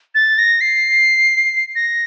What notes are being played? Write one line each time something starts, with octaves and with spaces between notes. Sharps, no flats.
A6
A#6
C7
A#6